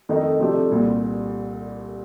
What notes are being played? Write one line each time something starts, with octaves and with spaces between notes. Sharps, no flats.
F2 D#3 A3 D#4
C3 F3 A3 D4 G4
C2 A#2 G3